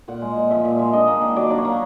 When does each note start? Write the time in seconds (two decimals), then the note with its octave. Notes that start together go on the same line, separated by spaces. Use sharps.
0.08 A#2 F#5
0.22 G#3
0.36 A#2
0.50 F3 E5
0.65 A#2
0.79 G#3
0.93 D4 D#5
1.08 A#3
1.22 D#3
1.36 F#3 D5
1.50 D4
1.58 C#5
1.65 A#3